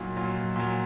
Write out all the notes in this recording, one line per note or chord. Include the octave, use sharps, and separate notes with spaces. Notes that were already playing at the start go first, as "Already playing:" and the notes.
Already playing: A#2 F#3 D#4
A#2 F#3 F4
A#2 F#3